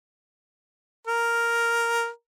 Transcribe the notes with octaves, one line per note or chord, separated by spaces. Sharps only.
A#4